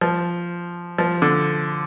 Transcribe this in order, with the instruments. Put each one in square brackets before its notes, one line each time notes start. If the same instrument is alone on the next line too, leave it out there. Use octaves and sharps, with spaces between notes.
[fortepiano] F3
F3
D3